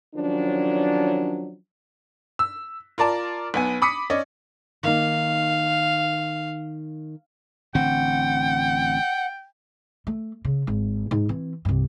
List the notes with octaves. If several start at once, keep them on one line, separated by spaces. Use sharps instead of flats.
D#3 F3 F#3 C#4 D4
E6
F4 A#4 D5 A5
B1 B3 G#5
B5 D6 D#6 B6 C#7
C#4 D5 D#5
D#3 A#3 D#4 F5
A1 D3 C4 F#5 G5
A3
C#3
G#1
G#2
E3 C4
C2 G2